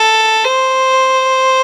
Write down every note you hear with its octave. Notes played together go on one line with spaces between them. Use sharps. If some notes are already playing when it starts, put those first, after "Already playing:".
Already playing: A4
C5